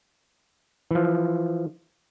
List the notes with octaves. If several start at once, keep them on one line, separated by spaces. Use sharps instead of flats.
E3 F3